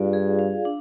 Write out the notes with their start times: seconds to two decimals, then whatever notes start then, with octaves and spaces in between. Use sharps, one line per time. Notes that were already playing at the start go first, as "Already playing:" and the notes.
Already playing: G2 F4 G#4 D5 F5
0.13 G#4
0.39 F5
0.65 D4